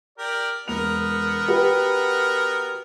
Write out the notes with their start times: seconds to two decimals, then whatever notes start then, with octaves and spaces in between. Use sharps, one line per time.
0.18 G4 A#4 D5
0.68 E1 B3 A#4 F7
1.48 F#4 G4 B4